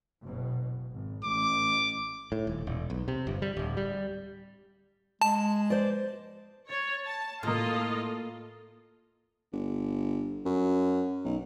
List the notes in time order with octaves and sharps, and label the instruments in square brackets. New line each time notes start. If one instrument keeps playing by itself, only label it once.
[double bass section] F#1 B2
G#1
[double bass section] A1 [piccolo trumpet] D6
[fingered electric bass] A2
D#1
E1
B1
C3
G1
G3
D1
G3
[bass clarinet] G#3 [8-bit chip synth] A5
[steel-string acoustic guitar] C5 D5
[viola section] C#5 [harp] A6
[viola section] A5
[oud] A2 [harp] A#3 F6 [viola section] F4 A4 D#5
[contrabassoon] G1
F#2
B1